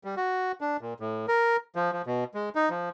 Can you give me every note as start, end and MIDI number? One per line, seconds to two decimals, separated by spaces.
0.04 0.15 55
0.17 0.52 66
0.61 0.77 62
0.81 0.94 46
1.00 1.26 45
1.28 1.57 70
1.76 1.91 53
1.93 2.02 53
2.06 2.24 47
2.34 2.49 56
2.55 2.69 63
2.70 2.89 53